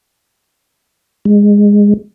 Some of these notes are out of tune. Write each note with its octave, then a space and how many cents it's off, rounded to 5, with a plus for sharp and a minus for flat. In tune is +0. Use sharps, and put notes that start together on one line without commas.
G#3 -15